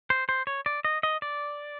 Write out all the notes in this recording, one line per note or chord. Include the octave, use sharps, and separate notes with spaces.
C5
C5
C#5
D5
D#5
D#5
D5